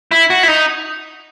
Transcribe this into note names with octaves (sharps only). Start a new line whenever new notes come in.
E4
F#4
E4
D#4